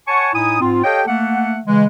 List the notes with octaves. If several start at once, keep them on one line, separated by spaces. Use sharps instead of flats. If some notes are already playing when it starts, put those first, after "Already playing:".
C#5 F#5 G#5 A5 C#6
A2 D#4 E4 G#5 D#6
G#2 C4 F4
G4 A4 C#5 D#5 F5 G5
A3 A#3 F#5
C#3 E3 G#3